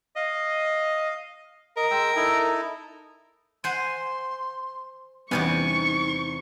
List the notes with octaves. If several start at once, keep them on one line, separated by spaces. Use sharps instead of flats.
D#5 F5
A#4 D#5
G#3 G5 E6
D#4 E4 A4
C5 F#5 G#5 C6
E2 C3 G3 B3 C#4 D#4 G#5 C#6